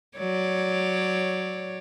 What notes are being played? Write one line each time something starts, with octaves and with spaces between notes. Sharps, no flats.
F#3 C#5 D5